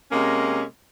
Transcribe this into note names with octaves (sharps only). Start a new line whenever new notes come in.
C3 G#3 A#3 C#4